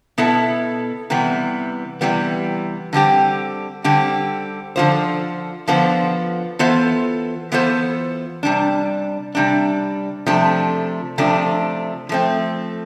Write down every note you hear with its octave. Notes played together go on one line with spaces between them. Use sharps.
B2 B3 E4 A4
C3 E3 G3 B3
C3 E3 G3 B3
D3 G3 C4 G4
D3 G3 C4 G4
D3 F3 B3 F4 C5
D3 F3 B3 F4 C5
E3 B3 F4 A4 C5
E3 B3 F4 A4 C5
C3 G3 D4
C3 G3 D4
C3 F3 A3 D4
C3 F3 A3 D4
F3 A3 C4